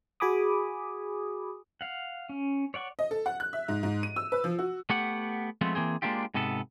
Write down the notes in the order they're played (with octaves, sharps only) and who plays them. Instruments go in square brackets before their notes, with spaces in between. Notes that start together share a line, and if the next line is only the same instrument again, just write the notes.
[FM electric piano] F#4 G#4 G#5 B5 D6 D#6
[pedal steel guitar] F5 F#5
C#4
C#5 D5 F#5 C#6
[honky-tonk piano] D#5
A4
F#5
F#6
E5
G#2
G#2
D#7
E6
B4
F3
F#4
[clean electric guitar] A3 B3 G4 F#5
F3 G#3 A3 B3 C4
E3 A#3 C4 G#4
G#3 A#3 C#4 D4 F4 G4
G#2 C3 B3 A4